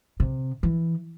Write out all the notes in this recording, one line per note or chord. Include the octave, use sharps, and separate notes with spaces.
C3
E3